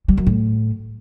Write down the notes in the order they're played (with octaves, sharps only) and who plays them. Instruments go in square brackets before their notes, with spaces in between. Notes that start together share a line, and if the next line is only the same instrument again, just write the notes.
[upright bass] G3
F#2
A2